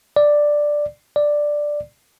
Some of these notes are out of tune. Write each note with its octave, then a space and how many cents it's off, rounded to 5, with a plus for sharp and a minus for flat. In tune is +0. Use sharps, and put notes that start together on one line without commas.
D5 +5
D5 +5